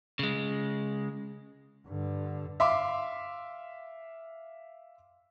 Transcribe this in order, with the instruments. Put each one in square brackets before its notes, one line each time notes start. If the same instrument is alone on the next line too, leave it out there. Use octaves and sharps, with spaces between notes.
[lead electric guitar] C#3 G#3
[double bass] G2 D3
[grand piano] E5 F5 C6 D6